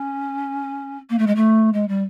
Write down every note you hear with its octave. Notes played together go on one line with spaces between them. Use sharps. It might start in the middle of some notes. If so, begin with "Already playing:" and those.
Already playing: C#4
A#3
A3
G#3
A3
G#3
G3